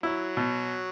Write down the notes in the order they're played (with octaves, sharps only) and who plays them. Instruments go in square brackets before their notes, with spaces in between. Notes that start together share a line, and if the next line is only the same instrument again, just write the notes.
[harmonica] F#3 [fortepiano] E4
[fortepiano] B2